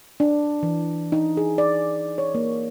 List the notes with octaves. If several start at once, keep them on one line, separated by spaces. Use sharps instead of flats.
D4
E3
D#4
G#4
D5
C#5
A#3